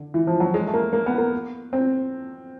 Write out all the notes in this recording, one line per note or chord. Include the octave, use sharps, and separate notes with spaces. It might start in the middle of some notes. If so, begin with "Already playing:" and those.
Already playing: D3
E3
F3
F#3
G#3
A3
A#3
A#3
B3
A#3
C4